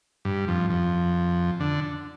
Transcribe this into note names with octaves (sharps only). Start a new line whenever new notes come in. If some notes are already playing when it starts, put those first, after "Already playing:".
G2
F2
F2
D3